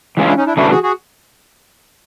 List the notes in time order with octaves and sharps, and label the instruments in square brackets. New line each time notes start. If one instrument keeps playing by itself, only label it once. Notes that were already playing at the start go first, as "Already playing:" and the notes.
[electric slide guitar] E3 G#3 C#4 F4
[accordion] D4 E4
C#4 D#4
D4 E4
[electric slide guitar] C#3 E3 A3 D4 [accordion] E4 F#4
[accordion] F#4 G#4
F#4 G#4